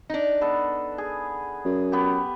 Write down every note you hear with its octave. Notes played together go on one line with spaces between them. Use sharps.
D4 D#4
B3 A4
G#4
F#2
B3 G4